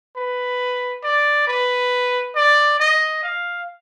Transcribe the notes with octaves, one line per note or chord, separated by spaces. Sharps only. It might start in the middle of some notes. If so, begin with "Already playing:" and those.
B4
D5
B4
D5
D#5
F5